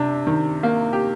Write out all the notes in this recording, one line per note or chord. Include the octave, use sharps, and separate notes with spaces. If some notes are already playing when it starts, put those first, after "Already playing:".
Already playing: C3 D4
D#3
A#3
G4